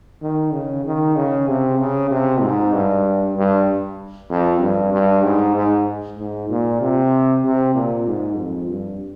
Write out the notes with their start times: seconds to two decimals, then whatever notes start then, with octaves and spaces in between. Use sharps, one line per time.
0.22 D#3
0.53 C#3
0.85 D#3
1.16 C#3
1.48 C3
1.79 C#3
2.11 C3
2.42 G#2
2.73 G2
3.36 G2
4.30 F2
4.61 G2
4.93 G2
5.24 G#2
5.56 G#2
6.18 G#2
6.50 A#2
6.81 C3
7.44 C3
7.75 A#2
8.07 G#2
8.38 F2
8.69 G2